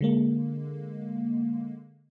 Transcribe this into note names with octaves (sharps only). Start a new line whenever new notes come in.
D3 G#3 A#3